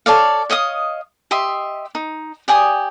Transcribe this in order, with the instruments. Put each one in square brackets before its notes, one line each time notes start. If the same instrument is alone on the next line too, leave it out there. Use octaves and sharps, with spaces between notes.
[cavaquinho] A4 C#5 D5 F5
C#5 D#5 F5 D#6
G4 D#5 E5 C6
D#4
G4 D5 G#5 D#6